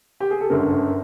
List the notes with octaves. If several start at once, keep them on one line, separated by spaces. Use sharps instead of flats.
G4
G#4
A4
G1 F#2 D3 A#4